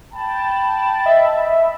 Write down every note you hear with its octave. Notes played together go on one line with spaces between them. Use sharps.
G5 A5 B5
D#5 E5